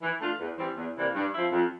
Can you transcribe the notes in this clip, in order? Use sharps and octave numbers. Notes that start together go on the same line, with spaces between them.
E3
A3 D4 F4
E2
E3 G3 C4
E2
C3 E3 G3 A#3
G2
F3 C4 E4
F2